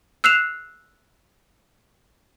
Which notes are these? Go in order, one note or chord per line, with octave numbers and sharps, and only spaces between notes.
E6 F#6 C7 E7 F7